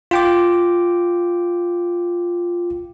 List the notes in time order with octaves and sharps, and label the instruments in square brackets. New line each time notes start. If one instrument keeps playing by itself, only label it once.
[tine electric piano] F4 G5 D6